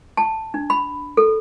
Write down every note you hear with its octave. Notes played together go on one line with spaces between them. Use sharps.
A5
D4
B5
A4